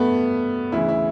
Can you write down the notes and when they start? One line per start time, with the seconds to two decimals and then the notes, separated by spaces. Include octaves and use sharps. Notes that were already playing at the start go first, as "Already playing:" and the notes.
Already playing: G2 A3 B3
0.72 D2 C#3 E3 E4
0.89 E4